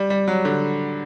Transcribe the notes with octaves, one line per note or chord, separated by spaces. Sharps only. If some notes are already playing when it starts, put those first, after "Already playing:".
Already playing: G3
G3
F#3
D3